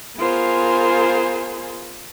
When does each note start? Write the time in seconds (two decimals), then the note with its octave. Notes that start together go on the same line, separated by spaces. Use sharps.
0.18 B3 F4 G#4 A#4 C5 G#5